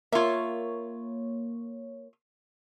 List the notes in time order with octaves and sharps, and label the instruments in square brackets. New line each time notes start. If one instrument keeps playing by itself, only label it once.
[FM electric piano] A#3 C#5 [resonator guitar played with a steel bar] F4 E5